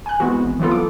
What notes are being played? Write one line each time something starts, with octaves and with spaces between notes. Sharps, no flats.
G#5 F#6
E3 G#3 B3 C4 F#4
G#1
E3 F#3 B3 F4 A4
D6